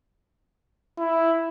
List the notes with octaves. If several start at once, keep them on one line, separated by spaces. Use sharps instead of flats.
E4